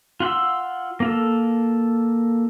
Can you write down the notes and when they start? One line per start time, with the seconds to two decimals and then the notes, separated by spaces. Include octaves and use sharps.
0.20 F4 F#5 C6 E6
1.00 A#3 F4 A4